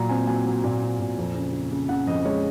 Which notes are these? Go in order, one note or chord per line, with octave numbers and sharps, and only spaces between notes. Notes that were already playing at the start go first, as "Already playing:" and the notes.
Already playing: A#2 F#3 A#5
C4 G#5
F#3 G#5
F#3
A#2
C4
A#2
F2
C#3
C#3
C#3
C#3 F#5
F2 D#5
G#3 C#5